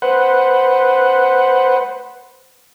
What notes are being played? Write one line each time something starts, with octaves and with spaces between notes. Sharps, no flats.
B4 C5 F#5